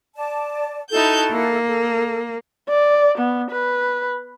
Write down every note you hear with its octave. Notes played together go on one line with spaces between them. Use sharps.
D5 A5
D#4 E4 F#4 A4 A5 G6
A#3
A4
D5
B3
B4